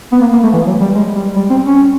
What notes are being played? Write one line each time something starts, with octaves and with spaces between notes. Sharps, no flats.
B3
A#3
A#3
A3
E3
F#3
G3
G#3
G3
G3
C4
C#4